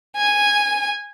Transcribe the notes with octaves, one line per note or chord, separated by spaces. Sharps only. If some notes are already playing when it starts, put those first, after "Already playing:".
G#5